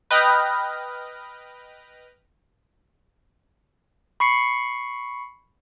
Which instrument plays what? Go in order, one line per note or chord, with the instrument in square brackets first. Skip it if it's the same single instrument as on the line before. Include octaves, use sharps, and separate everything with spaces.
[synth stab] B4 D#5 G5 F6 A#6
[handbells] B5 C#6 C7 C#7